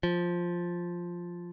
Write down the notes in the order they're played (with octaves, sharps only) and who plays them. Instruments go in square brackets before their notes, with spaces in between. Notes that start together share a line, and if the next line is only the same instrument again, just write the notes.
[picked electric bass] F3